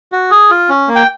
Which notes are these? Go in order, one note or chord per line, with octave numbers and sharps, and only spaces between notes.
F#4
G#4
F4
C#4
A#3
G5